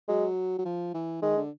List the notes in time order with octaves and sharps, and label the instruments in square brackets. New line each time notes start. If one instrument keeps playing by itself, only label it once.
[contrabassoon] F#3 [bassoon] G#3
[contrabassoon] F#3
F3
E3
[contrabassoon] D#3 [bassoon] G#3
[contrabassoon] D3